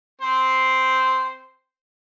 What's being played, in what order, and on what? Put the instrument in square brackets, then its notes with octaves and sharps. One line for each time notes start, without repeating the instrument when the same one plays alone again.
[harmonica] C4 C5